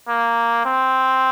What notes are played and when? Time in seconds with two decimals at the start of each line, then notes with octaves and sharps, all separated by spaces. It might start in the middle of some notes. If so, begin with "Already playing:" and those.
0.08 A#3
0.65 C4